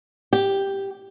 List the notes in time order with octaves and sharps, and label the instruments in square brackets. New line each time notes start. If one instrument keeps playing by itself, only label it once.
[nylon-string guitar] G4